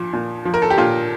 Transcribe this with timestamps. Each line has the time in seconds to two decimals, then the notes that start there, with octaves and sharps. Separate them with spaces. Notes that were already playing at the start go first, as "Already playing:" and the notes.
Already playing: A#2 F3
0.13 A#2
0.45 F3
0.54 A#4
0.62 A4
0.70 G4
0.77 A#2 F4